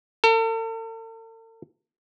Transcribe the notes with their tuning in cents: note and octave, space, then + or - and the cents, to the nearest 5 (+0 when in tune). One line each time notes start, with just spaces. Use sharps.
A4 +45